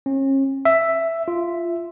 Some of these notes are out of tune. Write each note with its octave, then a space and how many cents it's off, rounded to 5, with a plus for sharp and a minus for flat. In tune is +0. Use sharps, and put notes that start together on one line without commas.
C#4 -35
E5 +5
F4 -15